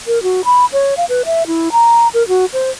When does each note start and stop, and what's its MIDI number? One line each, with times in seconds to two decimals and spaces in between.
0.07 0.22 70
0.23 0.41 66
0.45 0.65 83
0.73 0.94 73
0.97 1.05 77
1.09 1.22 71
1.26 1.47 76
1.47 1.72 64
1.72 2.08 82
2.14 2.26 70
2.28 2.45 66
2.53 2.71 72